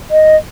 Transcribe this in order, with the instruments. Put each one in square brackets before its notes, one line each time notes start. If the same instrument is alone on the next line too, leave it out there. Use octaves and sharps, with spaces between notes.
[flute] D#5